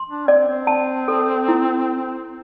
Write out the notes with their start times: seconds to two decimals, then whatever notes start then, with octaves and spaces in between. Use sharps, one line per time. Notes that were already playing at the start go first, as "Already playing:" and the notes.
Already playing: C6
0.08 D4
0.28 C4 D5
0.48 C4
0.67 A5
1.08 A4
1.48 E4